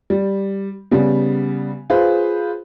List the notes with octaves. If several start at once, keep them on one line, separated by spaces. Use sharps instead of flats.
G3
C#3 G3 B3
F4 G#4 B4 C5